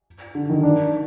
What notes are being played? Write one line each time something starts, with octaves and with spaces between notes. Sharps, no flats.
D3
D#3
D4